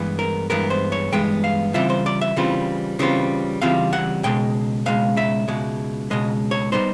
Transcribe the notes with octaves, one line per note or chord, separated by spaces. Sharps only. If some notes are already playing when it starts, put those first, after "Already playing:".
Already playing: G2 E3 G#3 B3
A#4
G2 E3 G#3 B3 A#4
C5
C#5
G2 E3 G#3 B3 G5
F5
C#3 E3 G3 C4 F4 E5
C5
D5
E5
C#3 E3 G3 C4 F4
C#3 E3 G3 C4 F4
C#3 E3 G3 C4 F4 F5
F#5
C#2 B2 G#3 G5
C#2 B2 G#3 F5
E5
C#2 B2 G#3
C#2 B2 G#3 D#5
C#5
B2 G3 B3 D#4 C5